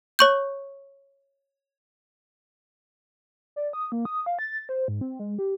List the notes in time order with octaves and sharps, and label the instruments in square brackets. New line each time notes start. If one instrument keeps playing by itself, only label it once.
[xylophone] C#5 C#6 G6
[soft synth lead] D5
D#6
A#3
D#6
F5
A6
C5
G#2
C4
G#3
G4